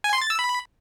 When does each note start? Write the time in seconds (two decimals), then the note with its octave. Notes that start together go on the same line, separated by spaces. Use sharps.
0.04 G#5
0.13 C6
0.22 A6
0.30 E6
0.39 B5